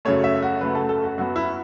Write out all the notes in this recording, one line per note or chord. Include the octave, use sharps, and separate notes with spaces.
F#2 C#3 A3 C#5
E5
F#4
F#2 C#3 A3 B4
A4
A4
F#4
F#2 F#3 B3 F#4
E4